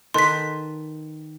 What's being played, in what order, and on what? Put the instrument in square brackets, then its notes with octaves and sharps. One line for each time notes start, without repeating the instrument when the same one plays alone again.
[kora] D#3 A4 B4 [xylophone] C6 B6